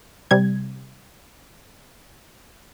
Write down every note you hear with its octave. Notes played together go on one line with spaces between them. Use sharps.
C3 G3 G#6